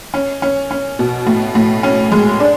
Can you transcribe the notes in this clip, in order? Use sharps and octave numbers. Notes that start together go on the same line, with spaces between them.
C#4
C#4
C#4
B2
A2
A2
C#4
G#3
D4